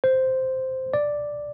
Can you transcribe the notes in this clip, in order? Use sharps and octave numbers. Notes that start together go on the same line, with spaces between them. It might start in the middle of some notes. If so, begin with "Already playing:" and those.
C5
D5